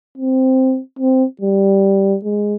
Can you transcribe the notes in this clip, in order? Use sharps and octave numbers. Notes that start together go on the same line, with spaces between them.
C4
C4
G3
G#3